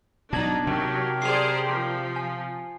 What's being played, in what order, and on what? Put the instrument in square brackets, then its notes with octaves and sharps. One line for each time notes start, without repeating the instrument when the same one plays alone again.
[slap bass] B2 F#3 [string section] D4 D#4 [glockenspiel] A5 G#6 F#7
[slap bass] C3 [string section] F#3 [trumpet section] G4 A#4
[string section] G#4 C5 D5 [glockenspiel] C7 F7
[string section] F3
[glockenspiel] G#5